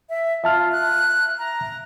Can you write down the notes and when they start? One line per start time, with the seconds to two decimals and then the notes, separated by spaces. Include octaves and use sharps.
0.10 E5
0.44 F4 E5 A5 F6
0.72 F#6
1.39 A#5